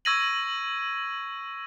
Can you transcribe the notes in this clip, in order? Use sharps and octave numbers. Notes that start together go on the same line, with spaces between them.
C#6 E6 G#6 A#6 D#7 F#7